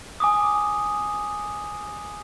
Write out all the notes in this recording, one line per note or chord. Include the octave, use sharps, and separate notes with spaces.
G#5 D6 D#6